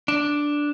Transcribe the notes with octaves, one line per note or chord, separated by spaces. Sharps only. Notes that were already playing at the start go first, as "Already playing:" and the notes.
D4